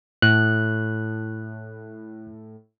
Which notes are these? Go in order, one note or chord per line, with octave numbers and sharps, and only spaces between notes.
A2 F#6